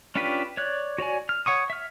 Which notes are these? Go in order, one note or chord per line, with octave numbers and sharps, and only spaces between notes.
C#4 D4 F4 G4 B4
C#5 D5 F#6
F#4 C#5 D5 G#5
F6
C#5 F#5 C#6 D#6
E5 F6